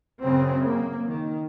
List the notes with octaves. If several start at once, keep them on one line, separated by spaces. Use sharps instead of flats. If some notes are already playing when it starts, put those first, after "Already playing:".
F#2 C#3 C4
A#3
D#3